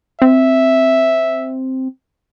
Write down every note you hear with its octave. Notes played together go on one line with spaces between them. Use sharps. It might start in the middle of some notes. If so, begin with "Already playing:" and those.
C4 E5